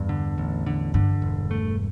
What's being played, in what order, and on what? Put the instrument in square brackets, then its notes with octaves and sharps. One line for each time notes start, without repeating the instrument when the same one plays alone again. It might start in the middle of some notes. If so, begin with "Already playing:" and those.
Already playing: [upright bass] E2 [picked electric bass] G2
[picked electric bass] D3
A1
D3
[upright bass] G2 [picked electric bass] D3
[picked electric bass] E1
A3